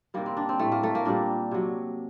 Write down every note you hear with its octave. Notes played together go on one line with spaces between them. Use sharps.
C3 D#3 G3 A#3
C4
D4
C4
A2 G3 A3
A#3
A3
A#3
A#2 G3 D4
C3 F#3